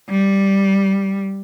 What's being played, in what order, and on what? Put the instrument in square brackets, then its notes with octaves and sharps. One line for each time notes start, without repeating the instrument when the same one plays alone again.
[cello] G3